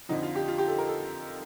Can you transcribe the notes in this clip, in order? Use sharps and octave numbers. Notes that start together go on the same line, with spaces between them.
F2 D3 F3 D#4
F4
G4
F4
G4
A4
A#4
A4